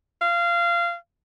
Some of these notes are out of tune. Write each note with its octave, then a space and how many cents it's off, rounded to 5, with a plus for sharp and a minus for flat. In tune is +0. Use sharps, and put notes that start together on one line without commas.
F5 -20